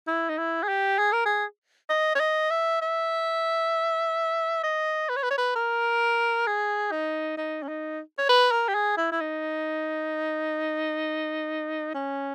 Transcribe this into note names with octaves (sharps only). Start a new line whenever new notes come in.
E4
D#4
E4
G#4
G4
G#4
A#4
G#4
D#5
C#5
D#5
E5
E5
D#5
B4
C#5
B4
C#5
B4
A#4
G#4
D#4
D#4
C#4
D#4
C#5
B4
A#4
G4
G#4
E4
E4
D#4
C#4